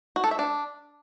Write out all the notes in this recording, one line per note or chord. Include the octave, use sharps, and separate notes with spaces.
F#4
A4
E5
D4